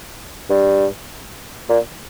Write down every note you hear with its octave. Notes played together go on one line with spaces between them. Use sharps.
G2
A#2